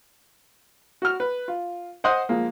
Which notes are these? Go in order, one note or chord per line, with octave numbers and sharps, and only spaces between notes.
F#4 F6
B4
F4
C5 D#5 F#5 C6 D#6 F#6
F3 G#3 A#3